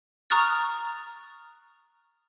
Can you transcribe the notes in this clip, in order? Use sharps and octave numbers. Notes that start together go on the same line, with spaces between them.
A#5 C#6 D#6 F6 F#6 A6